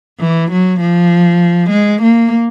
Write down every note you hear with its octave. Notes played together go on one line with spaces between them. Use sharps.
E3
F#3
F3
G#3
A#3